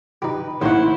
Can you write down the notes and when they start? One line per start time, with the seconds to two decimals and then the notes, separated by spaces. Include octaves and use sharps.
0.22 D#4 G4 B4
0.61 A1 D#3 A#3 E4 C5 C#5 F#5